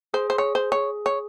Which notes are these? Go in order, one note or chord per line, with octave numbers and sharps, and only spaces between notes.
G#4 C5
C5
G#4 C#5
C5
C#5
C#5